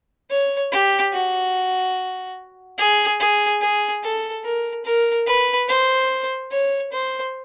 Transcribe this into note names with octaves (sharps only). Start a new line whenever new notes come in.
C#5
G4
F#4
G#4
G#4
G#4
A4
A#4
A#4
B4
C5
C#5
C5